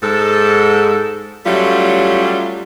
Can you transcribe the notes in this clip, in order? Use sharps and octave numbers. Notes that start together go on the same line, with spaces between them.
G#2 A4
F#3 G3 A3 C#4 F4